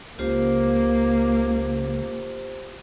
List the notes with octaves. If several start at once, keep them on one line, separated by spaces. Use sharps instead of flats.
C#2 A#3 F4 G4 C5